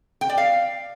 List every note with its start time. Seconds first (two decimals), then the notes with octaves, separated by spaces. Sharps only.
0.21 G5
0.29 D5
0.38 F5